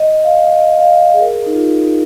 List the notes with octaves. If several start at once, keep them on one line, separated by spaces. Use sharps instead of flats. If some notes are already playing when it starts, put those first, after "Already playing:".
Already playing: D#5
D#5
F5
D#5
F5
D#5
G#4
A#4
D#4
F4
D#4